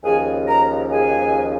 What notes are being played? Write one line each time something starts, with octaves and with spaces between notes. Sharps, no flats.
D#2 C#3 F3 G#4 G#5
A#4 A#5
G#4 G#5